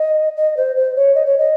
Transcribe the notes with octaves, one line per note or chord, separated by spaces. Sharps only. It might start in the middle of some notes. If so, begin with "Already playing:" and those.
Already playing: D#5
D#5
C5
C5
C#5
D#5
C#5
D#5